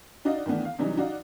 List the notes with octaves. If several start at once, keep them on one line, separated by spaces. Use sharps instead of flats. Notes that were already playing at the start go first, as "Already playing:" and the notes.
D4 D#4 F#4 D5 D#5 F5
D#3 E3 A3 B3 D4
F5
C3 E3 F#3 G3 D4 D#4
D#4 F#4 D5 F5